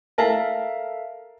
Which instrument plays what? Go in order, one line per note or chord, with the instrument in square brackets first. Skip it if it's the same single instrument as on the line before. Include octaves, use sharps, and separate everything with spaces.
[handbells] A4 E5 F5 [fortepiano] A#4 A5